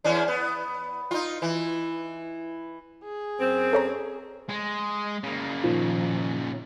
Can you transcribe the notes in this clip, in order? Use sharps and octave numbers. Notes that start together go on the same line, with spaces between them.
E2 C#4 D4
B3
D#4 F4
E3
G#4
F#2 C4
A4 C#5 A#5
G#3
C#3 A#3
A#2 D#3 F3